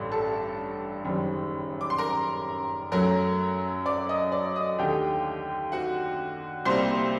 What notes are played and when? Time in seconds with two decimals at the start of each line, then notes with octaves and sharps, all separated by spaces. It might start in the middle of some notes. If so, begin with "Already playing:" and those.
Already playing: A1 G2 D3
0.12 A4 A5
1.04 F#1 F#2 D#3 G3
1.81 D6
1.90 C6
1.98 A#4 A#5
2.92 F#2 F#3 A3 A#4 A#5
3.86 D5 D6
4.09 D#5 D#6
4.32 D5 D6
4.56 D#5 D#6
4.78 D#2 D3 A3 G4 G5
5.72 F#4 F#5
6.65 C2 C3 G3 A#3 C5 C6